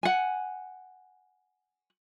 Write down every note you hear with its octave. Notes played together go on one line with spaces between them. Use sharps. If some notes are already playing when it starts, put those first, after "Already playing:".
F#5 G#5